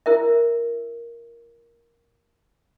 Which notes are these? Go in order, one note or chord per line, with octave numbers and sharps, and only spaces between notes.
E4 A#4 E5